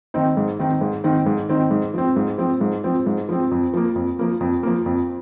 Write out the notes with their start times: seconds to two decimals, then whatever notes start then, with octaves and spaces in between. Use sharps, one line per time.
0.14 D#3 C4 D#4
0.37 G#2
0.60 D#3 C4 D#4
0.81 G#2
1.04 D#3 C4 D#4
1.26 G#2
1.49 D#3 C4 D#4
1.71 G#2
1.94 F3 C4
2.16 G#2
2.38 F3 C4
2.61 G#2
2.84 F3 C4
3.06 G#2
3.29 F3 C4
3.51 F2
3.74 F3 A#3
3.96 F2
4.19 F3 A#3
4.41 F2
4.63 F3 A#3
4.86 F2